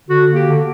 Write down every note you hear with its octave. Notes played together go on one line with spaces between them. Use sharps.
D3 F#4
A#3
G4
D3